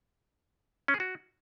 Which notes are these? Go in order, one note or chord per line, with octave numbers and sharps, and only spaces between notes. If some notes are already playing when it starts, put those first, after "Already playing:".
C#4
G#4
F#4